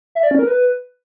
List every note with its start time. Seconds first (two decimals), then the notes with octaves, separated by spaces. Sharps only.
0.15 E5
0.23 D5
0.31 C#4
0.39 A#4
0.47 B4